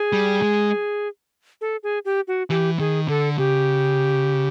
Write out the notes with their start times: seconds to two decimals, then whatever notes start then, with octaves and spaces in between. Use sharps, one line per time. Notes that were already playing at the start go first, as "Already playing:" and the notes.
Already playing: G#4
0.13 G3
0.42 G#3
1.61 A4
1.83 G#4
2.05 G4
2.28 F#4
2.50 E3 G4
2.79 D#3 G#4
3.08 D3 A4
3.38 C#3 G4